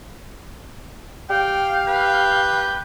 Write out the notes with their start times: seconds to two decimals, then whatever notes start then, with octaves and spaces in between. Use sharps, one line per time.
1.30 G4 F5 G5
1.87 B4 G6